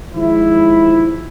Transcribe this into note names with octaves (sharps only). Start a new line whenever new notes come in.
D#3 F3 G#3 E4